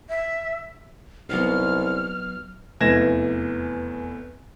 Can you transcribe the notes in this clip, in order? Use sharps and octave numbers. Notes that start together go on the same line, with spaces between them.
E5
C2 F#3 B3 D#4 F6
F1 E2 E3 G#6 A#6 E7